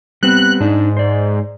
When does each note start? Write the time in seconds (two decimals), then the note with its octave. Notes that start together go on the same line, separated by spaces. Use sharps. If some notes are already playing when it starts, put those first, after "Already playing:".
0.23 G3 B3 C4 F#6
0.61 G#2 D4 D#4
0.97 C5 D5